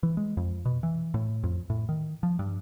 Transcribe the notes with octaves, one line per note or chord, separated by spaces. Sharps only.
E3
G#3
F2
B2
E3
A2
F2
A2
D#3
F3
G2